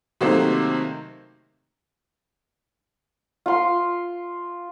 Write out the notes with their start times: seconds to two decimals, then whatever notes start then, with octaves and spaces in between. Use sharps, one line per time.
0.21 C3 D#3 F#3 A3 A#3 C5
3.46 F4 C6